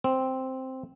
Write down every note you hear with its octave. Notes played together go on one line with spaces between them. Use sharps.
C4